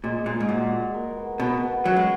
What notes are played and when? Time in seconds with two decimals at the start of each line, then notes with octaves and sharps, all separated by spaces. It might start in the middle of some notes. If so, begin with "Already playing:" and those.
0.04 A#2 G#3
0.26 A#2 G#3
0.40 G#2
0.49 A#2 F#4
0.72 G#3
0.94 A#4
1.17 B3
1.40 B2 F#4
1.63 B3
1.85 F#3 C#4
1.96 G#3